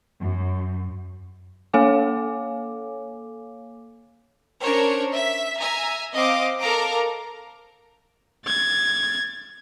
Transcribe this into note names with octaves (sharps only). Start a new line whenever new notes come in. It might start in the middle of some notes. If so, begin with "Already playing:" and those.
F#2
A#3 A4 C#5 F5 G#5 D6
C#4 D4 A#4 C5 C#5
E5 B6
E5 G#5 A#5
C4 D#5 F5 D6
A4 A#4 F5 A#5 D6
G#6 A6